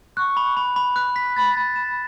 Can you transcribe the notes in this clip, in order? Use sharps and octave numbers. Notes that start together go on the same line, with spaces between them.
C#6 F#6
B5
B5
B5
F#6
B6
B5 A6
A6
E7